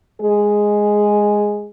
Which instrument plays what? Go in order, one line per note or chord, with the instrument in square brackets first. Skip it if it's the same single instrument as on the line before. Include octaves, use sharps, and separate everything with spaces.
[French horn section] G#3 G#4